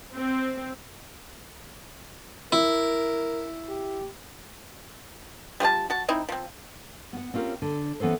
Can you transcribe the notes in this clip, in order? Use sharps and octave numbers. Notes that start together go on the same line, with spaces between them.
C4
E4 A#4
G4
G3 F4 C5 A5
F#4 A5
C4 D#4 E4
F3 C4
B3 F#5
C4 C#4 F4 G4 A#4
D3
E3 B3 C#4 A4 C5